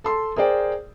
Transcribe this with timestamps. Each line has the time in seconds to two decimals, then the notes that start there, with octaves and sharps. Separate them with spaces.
0.04 A4 C6
0.36 G#4 A#4 C5 D5 G5